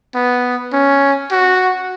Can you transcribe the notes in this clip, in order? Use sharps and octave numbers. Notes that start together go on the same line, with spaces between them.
B3
C#4
F#4